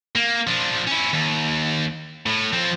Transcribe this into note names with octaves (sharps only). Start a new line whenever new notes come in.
A#3
F3 D4
C#4 E4
D#2
A2
F3 C4